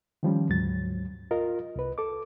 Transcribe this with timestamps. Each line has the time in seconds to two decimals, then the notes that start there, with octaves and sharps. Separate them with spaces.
0.23 D#3 F3 G3 C#4
0.49 D2 G#2 F#3 A6
1.31 F4 A#4 D#5
1.76 C2 B4
1.98 A4 D6